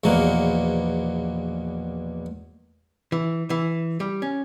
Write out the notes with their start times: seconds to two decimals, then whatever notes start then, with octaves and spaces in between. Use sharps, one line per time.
0.04 A#1 E2 B2 A#3
3.12 E3
3.50 E3
4.00 G3
4.22 C#4